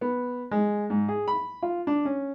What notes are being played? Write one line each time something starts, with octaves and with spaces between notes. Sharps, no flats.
B3
G#3
G#2
G#4
B5
F4
D4
C#4